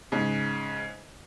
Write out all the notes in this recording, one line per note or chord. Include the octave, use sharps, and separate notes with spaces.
G#2 C#3